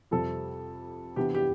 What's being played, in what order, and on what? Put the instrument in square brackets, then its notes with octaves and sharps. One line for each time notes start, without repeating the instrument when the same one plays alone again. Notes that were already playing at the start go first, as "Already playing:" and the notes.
[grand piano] F2 C3 G3 C4 A4
C3 E3 B3 D4 G4
G4